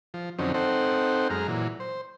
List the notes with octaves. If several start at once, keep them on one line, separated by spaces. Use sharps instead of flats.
F3
F2 D3 F#3 C4 C#4 D#4
C4 D#4 A4 C5 F#5 G5
F#2 G#3 A#5 F6
A#2 E3 F#3
C5